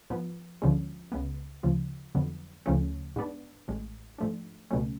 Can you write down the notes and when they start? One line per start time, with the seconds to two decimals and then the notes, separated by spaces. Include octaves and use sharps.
0.10 G#2 F3 B3
0.62 D2 D3 F3 G#3 C#4
1.12 C#2 C#3 G#3 B3
1.63 D2 C#3 F3
2.15 F2 D3 F#3 B3
2.66 D2 C#3 F3 A3 C#4
3.16 G#2 G#3 B3 D4
3.68 A1 A2 G#3
4.18 G#2 F3 A3 D4
4.71 C#2 B2 F#3 A3 C#4